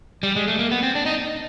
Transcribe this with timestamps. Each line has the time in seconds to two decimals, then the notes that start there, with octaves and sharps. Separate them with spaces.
0.23 G3
0.36 G#3
0.48 A3
0.59 A#3
0.71 B3
0.83 C4
0.95 D4
1.06 D#4